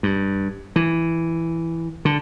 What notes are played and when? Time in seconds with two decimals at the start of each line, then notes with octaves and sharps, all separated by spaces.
0.03 G2
0.76 E3
2.05 D3